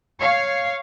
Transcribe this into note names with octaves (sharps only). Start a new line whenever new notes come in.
C#5 F5